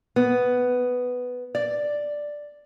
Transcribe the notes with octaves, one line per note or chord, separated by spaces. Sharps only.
B3
D5